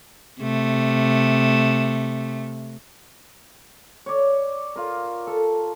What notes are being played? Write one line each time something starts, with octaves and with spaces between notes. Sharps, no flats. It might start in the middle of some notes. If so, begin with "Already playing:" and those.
C3 A3
C#5 D5
F4 A#4
A4